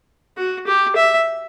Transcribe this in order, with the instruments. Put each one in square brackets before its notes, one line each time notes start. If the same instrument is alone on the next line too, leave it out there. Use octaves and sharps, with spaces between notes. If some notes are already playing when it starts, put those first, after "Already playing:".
[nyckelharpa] F#4
G4
E5